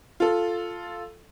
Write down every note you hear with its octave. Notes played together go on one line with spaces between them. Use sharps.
F4 A4